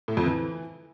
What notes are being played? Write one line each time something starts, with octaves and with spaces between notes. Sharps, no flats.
A2
F2
E3